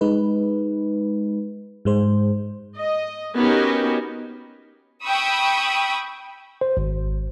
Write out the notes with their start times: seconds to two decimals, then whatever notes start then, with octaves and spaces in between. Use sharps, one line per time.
0.01 G#3 D#4 B4
1.85 G#2 G#3 C5
2.77 D#5
3.34 B3 C#4 D#4 F#4 G4 A#4
5.05 G5 B5 C#6 D#6 E6
6.61 C5
6.77 G#1